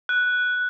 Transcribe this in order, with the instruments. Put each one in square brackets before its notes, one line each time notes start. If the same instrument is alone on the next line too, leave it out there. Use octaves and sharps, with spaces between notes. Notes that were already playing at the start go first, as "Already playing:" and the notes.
[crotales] F#6